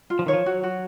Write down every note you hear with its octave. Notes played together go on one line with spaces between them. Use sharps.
F4
F3
D#3 C#5
F3
F#3 F#4
F#4